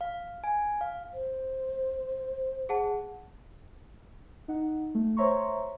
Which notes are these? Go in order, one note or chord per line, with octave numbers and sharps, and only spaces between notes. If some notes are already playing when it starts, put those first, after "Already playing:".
F5
G#5
F5
C5
G#4 F#5 A5
D#4 F#5
A3
C5 C#5 E5 A#5 C6 C#6